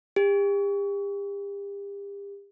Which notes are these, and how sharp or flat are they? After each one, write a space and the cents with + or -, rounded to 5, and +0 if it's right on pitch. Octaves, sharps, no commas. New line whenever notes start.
G4 +40